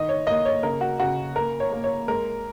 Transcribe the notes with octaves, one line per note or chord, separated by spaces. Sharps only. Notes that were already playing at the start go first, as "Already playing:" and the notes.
Already playing: D#3 D#5
C#5
A#3 D#5
C#5
C#3 A#4
F#4
C#3 F#4
A#3 A#4
C#5
A#3
C#5
G#3 A#4